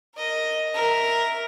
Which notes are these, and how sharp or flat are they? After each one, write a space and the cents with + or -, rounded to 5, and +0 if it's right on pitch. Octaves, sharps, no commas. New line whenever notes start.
A#4 -15 D#5 +0
A#4 +0 E5 -10